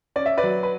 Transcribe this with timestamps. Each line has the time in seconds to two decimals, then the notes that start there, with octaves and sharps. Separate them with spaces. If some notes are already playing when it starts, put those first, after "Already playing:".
0.16 C#4 D5
0.26 E5
0.38 B4 D5
0.43 F#3
0.63 B4